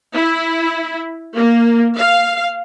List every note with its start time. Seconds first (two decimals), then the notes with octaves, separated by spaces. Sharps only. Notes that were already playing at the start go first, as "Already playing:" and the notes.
0.15 E4
1.35 A#3
1.98 F5